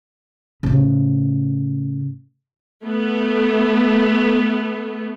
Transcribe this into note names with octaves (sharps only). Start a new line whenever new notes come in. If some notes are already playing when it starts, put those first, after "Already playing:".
A2 C#3
A3 B3